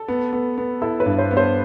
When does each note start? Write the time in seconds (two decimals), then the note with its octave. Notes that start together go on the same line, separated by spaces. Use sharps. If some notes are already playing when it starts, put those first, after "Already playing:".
Already playing: A4
0.08 B3
0.33 B3
0.58 B3
0.82 E4 A4
1.00 B4
1.06 G2
1.18 C5
1.31 B3
1.37 C5